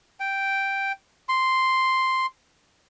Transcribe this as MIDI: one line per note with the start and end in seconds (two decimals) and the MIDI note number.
0.20 0.92 79
1.29 2.26 84